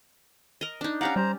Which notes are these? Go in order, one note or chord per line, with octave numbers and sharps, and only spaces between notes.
A#4 D#5
D4 D#4
C#4 G4 D5 F5 F#5 A#5
G3 C5 A#5